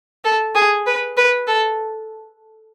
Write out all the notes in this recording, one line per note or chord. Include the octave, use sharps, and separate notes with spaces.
A4
G#4
B4
B4
A4